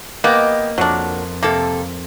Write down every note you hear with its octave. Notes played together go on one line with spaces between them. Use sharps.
A#3 B3 G4 D#5
F2 F#3 D4 A#4
C3 A#3 A4